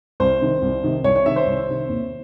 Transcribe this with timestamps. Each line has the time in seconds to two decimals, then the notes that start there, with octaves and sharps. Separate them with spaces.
0.20 C2 C5
0.41 C3 D#3
0.62 C2
0.83 C3 D#3
1.04 C2 C#5
1.16 C#5
1.26 C3 D#3 E5
1.36 C5
1.47 C2
1.68 C3 D#3
1.89 D#2